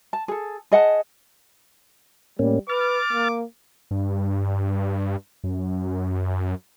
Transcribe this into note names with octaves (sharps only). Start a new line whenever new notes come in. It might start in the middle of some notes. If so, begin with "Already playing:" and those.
A5
G#4 A4
G#4 D#5 F#5 A5
A2 G3 A#3 C#4
B4 D6 F6 A6
A#3
G2
F#2